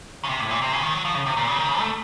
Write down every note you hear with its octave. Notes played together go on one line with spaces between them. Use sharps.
C#3
C3
A2
A#2
C3
C#3
D#3
F#3
F3
C#3
C3
A#2
C#3
D#3
C#3
A3